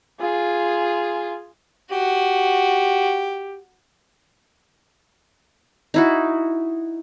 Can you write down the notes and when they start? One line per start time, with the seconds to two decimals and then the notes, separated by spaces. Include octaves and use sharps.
0.21 F4 G#4
1.91 F#4 G4
5.94 D#4 E4 F#4